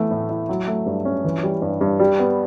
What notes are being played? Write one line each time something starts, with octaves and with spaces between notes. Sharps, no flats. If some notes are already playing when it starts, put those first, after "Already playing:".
Already playing: E3 A3 B3
A2
E4
F#3
A3
G2
C#4
E3
G3
G2
G2
G3
B3